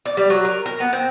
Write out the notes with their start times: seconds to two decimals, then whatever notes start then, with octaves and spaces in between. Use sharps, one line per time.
0.06 D5
0.17 G3
0.30 F#3
0.45 A#4
0.66 A#4
0.80 B3
0.93 C4